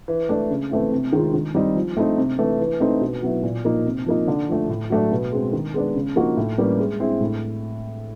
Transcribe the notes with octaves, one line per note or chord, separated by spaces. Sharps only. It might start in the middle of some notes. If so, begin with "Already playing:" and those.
E3
A3 D4
C#3
E3 A3 C4 E4
C3
D#3 G#3 C4 F4
D#3
G3 C4 D#4
F3
A3 C4 D#4
C3
E3 A3
E3
A3 C4 D#4
B2
F#3 B3 E4
A#2
F3 A#3 D#4
C3
F3 A#3 D#4
D3
F3 A3
A2
F#3 A3 D4
B2
G#3 C4
D#3
G#3 B3 D4
C#3
F3 A#3 D#4 F#4
A2
E3 G3 A#3 C#4
G#3
C4 E4 G#4
A2